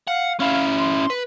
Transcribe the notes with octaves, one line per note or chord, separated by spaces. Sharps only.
F5 F#5
C#4 E4 F5
C6
B4